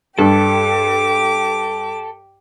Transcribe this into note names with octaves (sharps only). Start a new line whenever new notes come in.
G2 G4 A4 D6